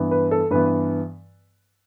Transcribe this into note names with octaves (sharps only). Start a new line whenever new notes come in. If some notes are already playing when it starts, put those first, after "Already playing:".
Already playing: G2 E3 B3
B4
A4
G2 E3 B3 B4